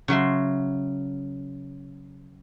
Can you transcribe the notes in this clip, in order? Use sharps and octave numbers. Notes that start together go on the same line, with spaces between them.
C#3 F#3 E5 C6